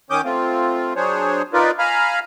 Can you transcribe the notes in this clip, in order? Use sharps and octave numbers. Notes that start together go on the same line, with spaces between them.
D#3 C#4 D6 D#6 G6
A3 C4 F4
F#3 D4 G#4 C5 C#5
D#4 F4 A#4 B4 D5
F5 G#5 A#5 B5 F6